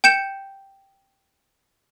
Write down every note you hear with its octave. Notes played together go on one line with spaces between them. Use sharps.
G5 G6 C#7 E7